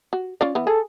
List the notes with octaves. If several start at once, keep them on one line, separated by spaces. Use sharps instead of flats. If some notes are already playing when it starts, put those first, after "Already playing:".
F#4
C#4 F4 D5
E3 B3
G#4 A4